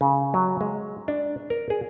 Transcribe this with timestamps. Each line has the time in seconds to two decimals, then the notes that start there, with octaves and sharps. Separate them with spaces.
0.01 C#3
0.34 F#3
0.61 G#3
1.08 D4
1.50 A#4
1.70 G#4